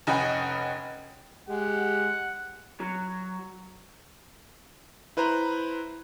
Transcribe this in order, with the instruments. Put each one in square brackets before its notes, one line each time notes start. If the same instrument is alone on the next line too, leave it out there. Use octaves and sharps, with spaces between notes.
[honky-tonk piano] F1 C#4 D#5 F#5 G5 B5
[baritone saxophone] G#3 [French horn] G4 [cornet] F#5
[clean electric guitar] F#3
[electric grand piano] E4 B4 C5 A#5